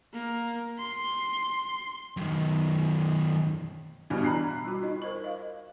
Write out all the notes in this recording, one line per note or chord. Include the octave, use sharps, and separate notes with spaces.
A#3
C6
F#2 D#3
G2 B2 E3
D4 A#5 B5 F#6 C7
G3 F4 F#4
D#4 F4 D#5
A#4 C5 C#6 F#7
D#5 F5